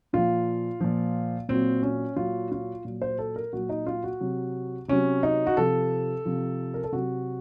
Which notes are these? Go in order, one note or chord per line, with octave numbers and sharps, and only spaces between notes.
A#2 F3 F4
A#2 F3
A#2 F#3 C4
C#4
A#2 F#3 F4
F4
A#2 F#3
C5
A4
A#4
A#2 F#3 F#4
D#4
F4
F#4
C3 F#3
C3 F#3 C#4
D#4
F#4
C3 F3 A4
C3 F3
A#4
A4
C3 F#3 F#4